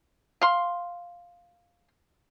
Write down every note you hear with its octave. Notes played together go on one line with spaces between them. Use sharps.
F5 C6